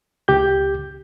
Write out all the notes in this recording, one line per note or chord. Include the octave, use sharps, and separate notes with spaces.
C#2 G4 G6